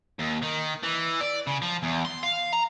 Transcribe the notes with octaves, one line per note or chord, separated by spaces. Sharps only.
D#2
D#3
E3
D5
C#3
F3
E2
C6
F5
A#5